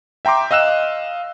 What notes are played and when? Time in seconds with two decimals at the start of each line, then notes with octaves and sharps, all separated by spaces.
0.25 E5 G5 A#5 C6 D6
0.51 D#5 F5 E6 F#6 E7